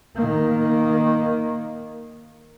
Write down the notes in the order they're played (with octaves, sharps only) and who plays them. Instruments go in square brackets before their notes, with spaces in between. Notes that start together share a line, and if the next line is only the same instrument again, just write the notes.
[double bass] D#3 A#3